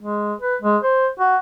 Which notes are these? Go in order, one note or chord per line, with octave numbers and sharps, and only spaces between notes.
G#3
B4
G#3
C5
F#4